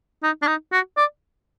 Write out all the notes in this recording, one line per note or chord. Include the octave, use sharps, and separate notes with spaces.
D#4
D4
D#4
F#4
D5